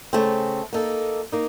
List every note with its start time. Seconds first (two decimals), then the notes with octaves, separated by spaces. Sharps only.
0.13 C#3 A3 C4
0.73 A#3 D#4 A4
1.32 A#3 D#4